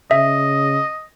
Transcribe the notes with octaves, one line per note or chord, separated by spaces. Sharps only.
C#3 D#5 E5